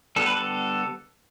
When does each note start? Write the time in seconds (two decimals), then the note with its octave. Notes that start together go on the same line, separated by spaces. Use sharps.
0.16 D3 G3 B3 A4
0.26 B4
0.37 A4